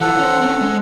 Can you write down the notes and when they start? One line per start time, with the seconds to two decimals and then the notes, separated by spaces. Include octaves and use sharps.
0.01 E3 F3 A4 F#5
0.19 C#4 C5
0.41 C4 C#4
0.61 G#3